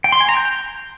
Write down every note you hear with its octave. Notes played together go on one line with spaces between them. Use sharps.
G5
C6
G#5
A#5
G6